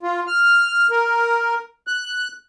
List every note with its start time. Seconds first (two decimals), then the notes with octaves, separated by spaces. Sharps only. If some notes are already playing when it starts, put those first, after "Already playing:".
0.03 F4
0.27 F6
0.91 A#4
1.87 F#6